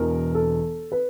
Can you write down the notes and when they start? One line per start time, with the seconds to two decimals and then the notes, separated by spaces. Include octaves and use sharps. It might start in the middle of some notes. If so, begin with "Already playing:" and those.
Already playing: E1 E2 B2 A#4
0.35 A4
0.92 B4